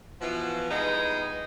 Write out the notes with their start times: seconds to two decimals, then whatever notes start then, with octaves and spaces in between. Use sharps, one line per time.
0.21 B2 E3 F3
0.70 G3 G#3 B3 D#4